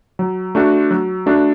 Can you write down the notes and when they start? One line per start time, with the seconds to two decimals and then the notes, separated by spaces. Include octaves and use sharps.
0.19 F#3
0.55 A3 D4 F#4
0.91 F#3
1.26 A3 D4 F#4